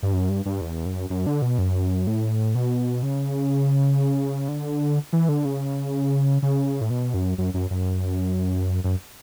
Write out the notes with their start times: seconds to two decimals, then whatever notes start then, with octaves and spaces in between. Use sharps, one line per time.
0.03 G2
0.14 F#2
0.29 G2
0.46 G2
0.61 E2
0.86 F#2
1.10 F#2
1.27 D3
1.42 B2
1.58 F#2
2.07 A2
2.55 B2
3.03 C#3
4.48 D3
5.13 E3
5.29 D3
5.45 C#3
6.42 C#3
6.81 A2
6.90 B2
7.14 F#2
7.38 F#2
7.54 F#2
7.71 F#2
8.84 F#2